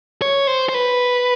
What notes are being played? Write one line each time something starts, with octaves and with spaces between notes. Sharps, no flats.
C#5
C5
C5
B4